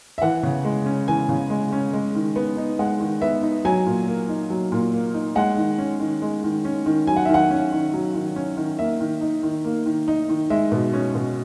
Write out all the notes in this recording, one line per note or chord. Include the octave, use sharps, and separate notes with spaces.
E5
E3 F#5
C#3
G#3
C#4
E3 G#5
C#3
G#3
C#4
G#3
D#3
B3
D#4
G#3 F#5
D#3
B3 E5
D#4
F#3 G#5
A#2
A#3
D#4
F#3
A#2
A#3
D#4
G#3 F#5
D#3
C#4
D#3
G#3
D#3
C#4
D#3
F#3 G#5
F#5
D#3 E5
F#5
C#4
D#3
F#3
D#3
C#4
D#3
A#3 E5
D#3
D#4
D#3
A#3
D#3
D#4
D#3
G#3 E5
B2
C#4
B2